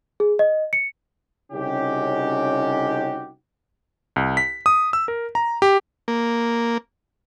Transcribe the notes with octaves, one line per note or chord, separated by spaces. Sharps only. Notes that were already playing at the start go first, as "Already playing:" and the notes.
G#4
D#5
C#7
C2 C#3 C#4 D#4 F#4 G4
C2
B6
D#6
E6
A#4
A#5
G4
A#3